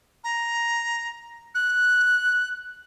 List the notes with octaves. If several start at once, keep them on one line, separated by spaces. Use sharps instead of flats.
A#5
F#6